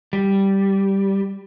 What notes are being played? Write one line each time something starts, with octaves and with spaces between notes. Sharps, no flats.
G3